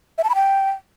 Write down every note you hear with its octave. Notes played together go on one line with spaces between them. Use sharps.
E5
A5
B5
G5